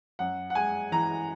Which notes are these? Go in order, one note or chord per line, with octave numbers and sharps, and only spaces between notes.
F#2 F#5
F#5
G#3 G#5
E3 A#5